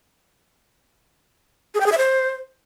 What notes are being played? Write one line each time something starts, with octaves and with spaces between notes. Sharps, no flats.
G#4
G5
G#4
E5
C5